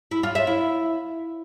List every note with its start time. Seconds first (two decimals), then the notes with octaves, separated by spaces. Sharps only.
0.11 E4
0.23 F4
0.35 E5
0.47 E4